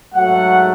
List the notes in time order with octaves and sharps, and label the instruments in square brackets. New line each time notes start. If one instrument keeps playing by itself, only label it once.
[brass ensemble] G#2 F#3 A3 F#5